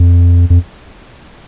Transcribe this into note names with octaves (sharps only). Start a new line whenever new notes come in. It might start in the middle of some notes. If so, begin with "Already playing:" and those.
Already playing: F2
F2